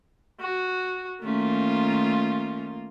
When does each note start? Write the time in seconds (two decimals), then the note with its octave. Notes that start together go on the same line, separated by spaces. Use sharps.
0.41 F#4
1.24 D#3 A3 A#3 C#4 F4